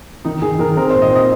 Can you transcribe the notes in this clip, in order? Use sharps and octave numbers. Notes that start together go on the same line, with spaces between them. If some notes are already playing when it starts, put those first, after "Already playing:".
D#3 D#4
D#3 G#4
D#3 A#4
C4 A#4
C5
A#2
D#5
C4
D#5